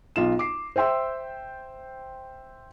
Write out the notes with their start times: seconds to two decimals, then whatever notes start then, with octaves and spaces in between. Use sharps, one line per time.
0.16 B1 F4 E7
0.39 D6 C7
0.76 C5 E5 G5 C6 E6